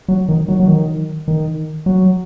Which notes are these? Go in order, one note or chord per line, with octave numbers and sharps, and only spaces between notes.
F#3
D#3
F#3
F#3
D#3
D#3
F#3